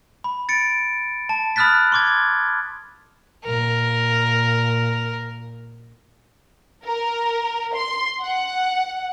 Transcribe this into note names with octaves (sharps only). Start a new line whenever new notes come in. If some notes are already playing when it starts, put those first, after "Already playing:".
B5
A6 C#7 D7
A5
B5 D#6 F6 F#6 A6 B6
C6 D6 G#6
A#2 A#4
A#4
C6
F#5